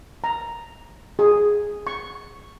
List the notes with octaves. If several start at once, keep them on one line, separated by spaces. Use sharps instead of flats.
A#5
G#4
C#6